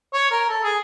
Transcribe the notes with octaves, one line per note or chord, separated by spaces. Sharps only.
C#5
A#4
A4
G#4